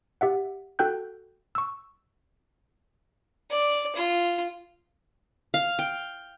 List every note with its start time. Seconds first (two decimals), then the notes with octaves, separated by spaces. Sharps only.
0.21 G4 E5 F#5
0.79 F#4 A4 G5 F#6 G6
1.55 C#6 E6
3.50 D5
3.95 F4
5.54 F5
5.79 G5